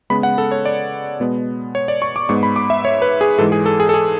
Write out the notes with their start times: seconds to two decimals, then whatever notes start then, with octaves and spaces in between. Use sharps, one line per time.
0.10 C#3 G#3 B3 B5
0.23 F#5
0.38 A4
0.51 C#5
0.65 D5
1.20 B2 G#3 B3
1.75 C#5
1.88 D5
2.02 C#6
2.16 D6
2.29 G#2 G#3 B3 C#6
2.43 B5
2.56 D6
2.70 E5
2.85 C#5
3.02 B4
3.21 G#4
3.38 G#2 E3 G#3 A4
3.52 G#4
3.66 A4
3.80 G#4
3.89 A4
3.94 G#4